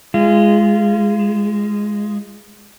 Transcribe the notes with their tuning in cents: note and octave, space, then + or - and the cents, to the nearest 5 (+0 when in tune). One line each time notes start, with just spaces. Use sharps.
G#3 +0 F4 -25